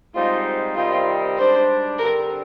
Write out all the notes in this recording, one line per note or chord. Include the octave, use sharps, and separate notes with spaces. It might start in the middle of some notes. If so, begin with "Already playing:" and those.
G#2 G3 C4 D#4 F4
C3 D#3 G3 C4 D#4 F4
G#2 G3 D4 G4 C5
G2 D3 G3 C4 A#4